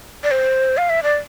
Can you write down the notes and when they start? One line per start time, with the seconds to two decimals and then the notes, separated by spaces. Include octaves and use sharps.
0.24 D5
0.31 C5
0.77 F5
0.90 E5
1.03 D5